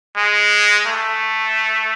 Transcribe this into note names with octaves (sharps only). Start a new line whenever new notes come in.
G#3
A3